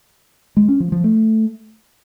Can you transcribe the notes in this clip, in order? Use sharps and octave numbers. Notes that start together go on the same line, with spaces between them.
G#3
C#4
F3
F3
A3